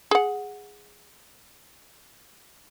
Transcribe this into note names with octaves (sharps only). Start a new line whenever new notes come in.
G#4 F#5